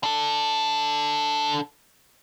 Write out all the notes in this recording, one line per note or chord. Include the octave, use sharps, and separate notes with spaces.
D4 A4